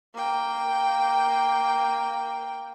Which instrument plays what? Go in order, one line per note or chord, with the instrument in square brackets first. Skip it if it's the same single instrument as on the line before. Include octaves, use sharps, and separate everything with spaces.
[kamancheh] A#3 G5